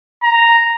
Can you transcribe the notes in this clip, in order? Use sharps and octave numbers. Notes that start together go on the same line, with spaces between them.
A#5